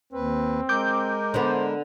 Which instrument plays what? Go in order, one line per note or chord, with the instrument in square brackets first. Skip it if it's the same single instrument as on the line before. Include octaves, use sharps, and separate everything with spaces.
[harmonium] D#2 B4 [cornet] C4
[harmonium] G#3 A#4 [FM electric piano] D6 G6
[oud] D3 B3 [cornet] C5